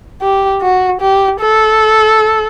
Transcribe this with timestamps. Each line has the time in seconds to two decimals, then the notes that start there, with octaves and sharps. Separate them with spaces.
0.22 G4
0.62 F#4
1.01 G4
1.41 A4